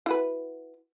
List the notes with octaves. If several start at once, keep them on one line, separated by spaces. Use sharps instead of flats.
E4 F#4 B4